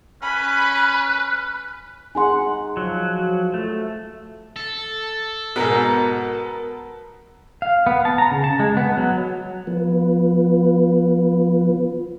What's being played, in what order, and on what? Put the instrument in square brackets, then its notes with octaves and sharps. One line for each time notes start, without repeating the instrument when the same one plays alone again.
[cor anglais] C#4 [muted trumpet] B4 [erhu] B5
[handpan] D#4 G#4 F#5 [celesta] G#5 C6
[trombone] F3 [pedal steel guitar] F#3
[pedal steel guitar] A3
[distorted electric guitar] A4
[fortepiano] G#2 B2 [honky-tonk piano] B3 A#4
[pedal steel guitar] F5
B3
A5
A#5
C#3
A5
G#3
B3
F#3
[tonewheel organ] F3 B3